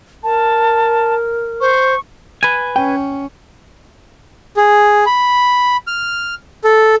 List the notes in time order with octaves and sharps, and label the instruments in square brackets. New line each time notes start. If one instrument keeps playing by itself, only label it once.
[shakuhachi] A#4 [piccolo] A5
[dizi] C5 [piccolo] C#6
[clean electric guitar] B4 G#5
[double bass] C#4 [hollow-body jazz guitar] G5
[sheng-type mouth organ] G#4
B5
F6
A4